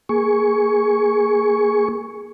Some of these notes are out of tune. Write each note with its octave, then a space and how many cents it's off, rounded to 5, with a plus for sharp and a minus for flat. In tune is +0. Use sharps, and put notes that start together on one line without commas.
A#3 +0 G#4 +0 C#6 +5